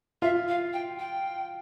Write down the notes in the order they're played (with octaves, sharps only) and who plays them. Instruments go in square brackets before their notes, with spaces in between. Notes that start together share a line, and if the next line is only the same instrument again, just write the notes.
[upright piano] F4 [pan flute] E5
[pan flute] F5
G5
G5